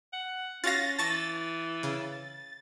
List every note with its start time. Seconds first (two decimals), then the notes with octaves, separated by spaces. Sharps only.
0.13 F#5
0.64 C#4 F4 F#4 F5 A6 A#6
0.99 E3 A5 C#6 A6 A#6
1.83 C#3